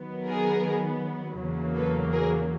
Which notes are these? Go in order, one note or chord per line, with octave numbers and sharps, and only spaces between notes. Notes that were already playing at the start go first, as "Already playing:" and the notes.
Already playing: D#3 F#3 B3
G#4 A#4
E2 C#3 F#3 A#3
A4 B4
G#4 A#4